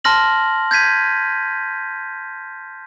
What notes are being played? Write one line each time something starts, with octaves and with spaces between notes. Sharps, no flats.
A5 C6 F6 A#6 F#7
G6 G#6 B6 D#7